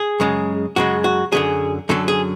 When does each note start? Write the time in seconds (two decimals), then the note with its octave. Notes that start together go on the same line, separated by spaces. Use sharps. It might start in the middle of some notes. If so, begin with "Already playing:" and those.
Already playing: G#4
0.20 F#2 C#3 G#3
0.76 F#2 C#3 G#3 F#4
1.04 F#4
1.32 F#2 D3 F#3 G#4
1.89 F#2 D3 F#3 A4
2.08 G#4